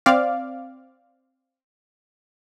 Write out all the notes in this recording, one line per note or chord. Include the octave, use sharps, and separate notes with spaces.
C4 D5 F5